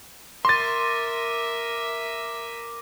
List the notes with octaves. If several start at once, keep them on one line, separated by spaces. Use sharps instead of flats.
A#4 E5 C6 D6 A6 A#6 D#7